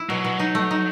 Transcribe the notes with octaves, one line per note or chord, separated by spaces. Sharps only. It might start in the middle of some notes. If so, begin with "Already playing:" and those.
Already playing: E4
B2 F#3
B2
D#4
A3
D#4